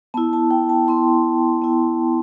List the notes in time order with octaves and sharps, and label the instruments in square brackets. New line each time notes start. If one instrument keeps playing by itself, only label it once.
[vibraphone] B3 E4 A5
A5
G5
A5
B3 E4 C6
B3 E4